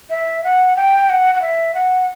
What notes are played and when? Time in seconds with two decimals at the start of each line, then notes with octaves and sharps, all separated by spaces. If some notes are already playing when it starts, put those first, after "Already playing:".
0.10 E5
0.44 F#5
0.76 G5
1.10 F#5
1.35 F#5
1.42 E5
1.74 F#5